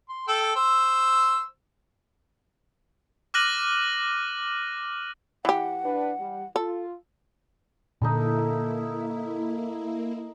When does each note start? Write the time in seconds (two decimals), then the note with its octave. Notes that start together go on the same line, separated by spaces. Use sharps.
0.09 C6
0.28 A4 G5 E6
0.56 C5 E6
3.34 D6 F6 F#6 A#6 D#7 F#7
5.45 E3 G4 F#5
5.84 D4 B4
6.19 G3
6.56 F4 A4
8.02 A#2 D3 A#3 D#4 E4 A4 B5